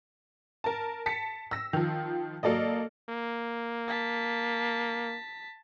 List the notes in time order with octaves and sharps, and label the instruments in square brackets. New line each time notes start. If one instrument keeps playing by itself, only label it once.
[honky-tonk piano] A#4 A5
A5 B6 C#7
E6 A#6
D#3 F3
F#3 A#3 A4 D5 D#5
[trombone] A#3
[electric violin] A5 B6